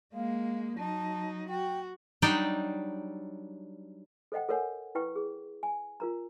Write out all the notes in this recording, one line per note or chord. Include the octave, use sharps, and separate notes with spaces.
G#3 A#3 F5
F#3 D#4 A5
F#4 G5
F#3 G3 D4 D#4 D5 G5
A4 C5 D#5 F#5 G5
A4 A#4 C#5 F#5 G#5
E4 B4 G5 C#6
G#4
G#5
F4 A#4 A#5